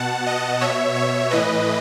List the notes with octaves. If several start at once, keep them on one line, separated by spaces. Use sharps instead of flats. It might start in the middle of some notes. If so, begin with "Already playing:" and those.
Already playing: B2 F#5 A5
D#5 F#5
B2 C#5 E5
C#5
A2 E3 B4 D#5